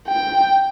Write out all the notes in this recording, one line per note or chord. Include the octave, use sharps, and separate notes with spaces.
G5